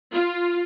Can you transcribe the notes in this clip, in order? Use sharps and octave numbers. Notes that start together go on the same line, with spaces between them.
F4